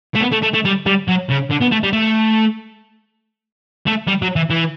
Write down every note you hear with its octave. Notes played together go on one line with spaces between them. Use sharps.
A3
B3
A3
A3
A3
G3
G3
F#3
C#3
D3
B3
A3
G3
A3
A3
G3
F#3
E3
E3